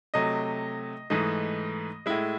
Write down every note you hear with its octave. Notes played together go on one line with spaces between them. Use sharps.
C3 F#3 A3 D#5
G#2 E3 A3 D#5
A2 G#3 E4